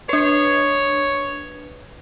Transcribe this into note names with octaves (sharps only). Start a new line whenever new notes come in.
D4 B4 C#5